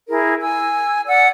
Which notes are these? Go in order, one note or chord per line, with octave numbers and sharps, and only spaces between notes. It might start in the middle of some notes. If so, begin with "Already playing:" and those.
E4 G#4 A#4
G#5 E6
D5 F#5 E6